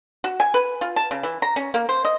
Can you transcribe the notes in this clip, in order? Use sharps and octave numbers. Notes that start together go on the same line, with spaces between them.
F#4
G#5
B4
F4
A5
C#3
E3
A#5
C#4
A#3
C5
D#5